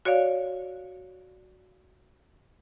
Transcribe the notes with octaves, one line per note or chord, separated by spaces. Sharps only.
F#4 C#5 D5 F5